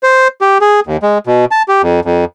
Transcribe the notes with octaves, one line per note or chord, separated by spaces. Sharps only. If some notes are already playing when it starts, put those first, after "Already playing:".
C5
G4
G#4
D#2
G#3
B2
A5
G4
F2
F2